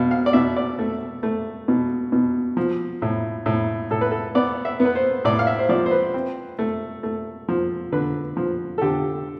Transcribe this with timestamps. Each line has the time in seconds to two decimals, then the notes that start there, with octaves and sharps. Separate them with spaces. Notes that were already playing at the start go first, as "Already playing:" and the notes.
Already playing: B2 F5
0.11 F5
0.26 D5
0.33 B2 E5
0.56 D5
0.79 A3
1.23 A3
1.68 B2
2.12 B2
2.57 F3
3.02 A2
3.46 A2
3.90 A2 A4
4.01 B4
4.11 A4
4.35 B3 D5
4.65 E5
4.80 B3
4.85 B4
4.95 C5
5.25 A2 D5
5.39 F5
5.47 E5
5.59 C5
5.69 F3 D5
5.86 C5
5.91 B4
6.14 C4
6.59 A3
7.03 A3
7.48 F3
7.92 D3 B4
8.37 F3
8.78 A4
8.82 D3 G4